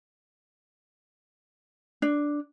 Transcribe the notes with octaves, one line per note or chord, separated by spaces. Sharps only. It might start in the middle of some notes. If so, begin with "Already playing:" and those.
D4